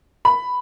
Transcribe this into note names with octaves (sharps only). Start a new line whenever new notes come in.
B5